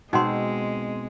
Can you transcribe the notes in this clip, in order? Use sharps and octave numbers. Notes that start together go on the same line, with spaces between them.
B2 G#3 C4 D#4 F#5 C6